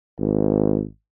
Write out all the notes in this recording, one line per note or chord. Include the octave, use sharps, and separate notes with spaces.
G#1